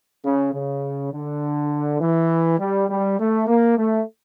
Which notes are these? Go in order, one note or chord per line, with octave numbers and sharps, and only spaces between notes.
C#3
C#3
D3
E3
G3
G3
A3
A#3
A3